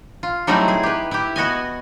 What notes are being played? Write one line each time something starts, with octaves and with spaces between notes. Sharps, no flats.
F4
F#3 G3 A3 C4 D#4 E4
G#4
G4 B4
E4 G4
B3 F#4 D#5 G#5